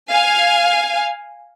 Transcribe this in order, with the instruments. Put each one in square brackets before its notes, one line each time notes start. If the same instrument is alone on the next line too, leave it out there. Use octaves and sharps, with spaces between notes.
[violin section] F5 G#5